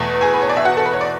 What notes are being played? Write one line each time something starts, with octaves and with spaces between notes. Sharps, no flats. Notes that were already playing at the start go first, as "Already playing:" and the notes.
Already playing: E2 B2 A3
G#4 G#5
B4
C#5
D5
E5
F#4 F#5
A4
B4
C#5
D5